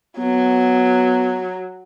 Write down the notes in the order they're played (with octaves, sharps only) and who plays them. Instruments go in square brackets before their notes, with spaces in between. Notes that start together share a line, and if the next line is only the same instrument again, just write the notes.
[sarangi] F#3 [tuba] B3